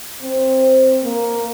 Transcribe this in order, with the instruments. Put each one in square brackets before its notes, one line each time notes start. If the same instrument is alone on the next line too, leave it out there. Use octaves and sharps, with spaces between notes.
[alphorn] C4
A#3